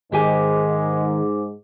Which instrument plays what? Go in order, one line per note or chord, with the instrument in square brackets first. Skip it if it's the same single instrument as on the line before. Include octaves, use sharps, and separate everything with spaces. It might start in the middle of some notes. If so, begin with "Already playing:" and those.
[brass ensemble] G#2 [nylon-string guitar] D#3 G4 G#5 [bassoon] G#3 [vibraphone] G#4 D6